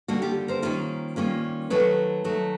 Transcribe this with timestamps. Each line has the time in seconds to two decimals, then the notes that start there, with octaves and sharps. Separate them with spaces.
0.08 D#2 D3 G3 A#3 D4 F#4
0.22 F4 G4
0.48 A#4 C5
0.62 D#3 G3 A#3 C#4 F4
1.16 D#3 G3 A#3 C#4 F4
1.70 D#3 F#3 A3 B4 C#5
2.24 D#3 F#3 A3